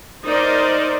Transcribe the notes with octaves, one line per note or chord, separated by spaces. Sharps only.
D#4 A#4 C5 D5